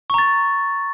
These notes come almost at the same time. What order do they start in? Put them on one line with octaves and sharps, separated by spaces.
C#6 A#5 A6